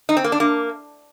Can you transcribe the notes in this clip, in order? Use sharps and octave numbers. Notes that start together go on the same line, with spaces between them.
D#4
C4
A#3
D4
A#3